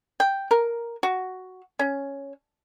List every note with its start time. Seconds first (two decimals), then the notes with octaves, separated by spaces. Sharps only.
0.20 G5
0.51 A#4
1.03 F#4
1.79 C#4